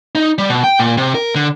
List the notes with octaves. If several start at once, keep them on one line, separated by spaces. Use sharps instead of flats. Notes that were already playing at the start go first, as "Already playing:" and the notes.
D#4
G3
B2
G5
A#2
C3
A#4
D3